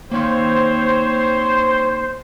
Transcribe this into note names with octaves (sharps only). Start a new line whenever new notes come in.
A#3 C4 D#4 C5 C#5 F5